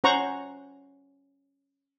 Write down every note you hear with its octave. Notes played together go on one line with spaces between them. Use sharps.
C#4 C5 F#5 A#5 C#6